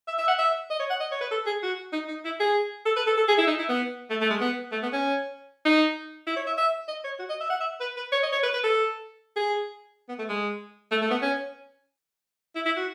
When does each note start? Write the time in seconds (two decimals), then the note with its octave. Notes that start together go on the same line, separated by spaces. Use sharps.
0.08 E5
0.18 E5
0.28 F#5
0.39 E5
0.70 D#5
0.80 C#5
0.90 F#5
1.00 D#5
1.11 C#5
1.21 B4
1.31 A4
1.46 G#4
1.63 F#4
1.93 D#4
2.08 D#4
2.25 E4
2.40 G#4
2.86 A4
2.96 B4
3.07 A4
3.17 A4
3.28 G#4
3.38 E4
3.47 D#4
3.58 E4
3.69 B3
4.10 A3
4.21 A3
4.30 G#3
4.40 B3
4.72 A3
4.83 B3
4.93 C#4
5.65 D#4
6.27 E4
6.36 C#5
6.47 E5
6.58 E5
6.88 D#5
7.04 C#5
7.19 F#4
7.29 D#5
7.40 E5
7.50 F#5
7.60 E5
7.81 B4
7.97 B4
8.12 C#5
8.23 D#5
8.32 C#5
8.43 B4
8.54 B4
8.64 A4
9.36 G#4
10.09 B3
10.18 A3
10.29 G#3
10.91 A3
11.02 A3
11.11 B3
11.22 C#4
12.55 E4
12.65 E4
12.77 F#4